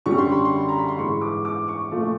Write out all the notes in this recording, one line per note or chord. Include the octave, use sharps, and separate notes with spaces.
F#2 D3 G3 C#6
C6
B5
C6
A#5
B5
C6
G#2 E3 G#3 C#6
D6
D6
C#6
A#2 F3 A3